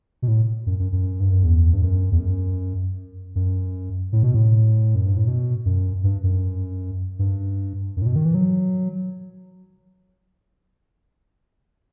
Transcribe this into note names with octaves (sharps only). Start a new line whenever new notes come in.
B2
A2
F#2
F#2
F#2
G2
F#2
E2
G2
F#2
E2
F#2
F#2
A2
B2
A2
F#2
G2
A2
B2
F#2
G2
F#2
G2
F#2
A2
B2
D#3
E3
F#3